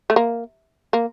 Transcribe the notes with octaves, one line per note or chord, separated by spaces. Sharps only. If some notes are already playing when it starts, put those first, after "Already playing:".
A3
A#3
A#3